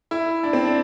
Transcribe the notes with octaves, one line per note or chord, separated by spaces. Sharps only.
E4
D4
C4
D4